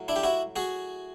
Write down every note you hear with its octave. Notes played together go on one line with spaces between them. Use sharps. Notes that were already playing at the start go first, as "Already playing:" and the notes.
Already playing: A2 F#3
D4 E4
G4
E4 F#4
F#4 G#4